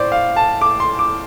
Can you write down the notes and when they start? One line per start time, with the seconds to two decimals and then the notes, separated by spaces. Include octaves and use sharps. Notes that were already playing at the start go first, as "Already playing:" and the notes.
Already playing: A2 C5 D5
0.12 F5
0.36 A5
0.61 D6
0.80 C6
0.99 D6